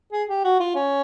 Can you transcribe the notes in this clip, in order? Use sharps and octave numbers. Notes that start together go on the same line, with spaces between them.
G#4
G4
F#4
F4
C#4